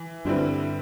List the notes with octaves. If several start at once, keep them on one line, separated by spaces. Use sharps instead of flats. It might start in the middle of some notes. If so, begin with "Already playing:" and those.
Already playing: E3
G2 D3 G3 C4 E4 B4